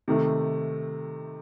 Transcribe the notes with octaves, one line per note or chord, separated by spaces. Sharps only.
C3 D#3 A3